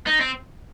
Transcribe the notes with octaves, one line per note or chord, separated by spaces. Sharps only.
D#4
C4